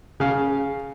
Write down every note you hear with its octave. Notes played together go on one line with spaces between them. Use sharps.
C#3 F5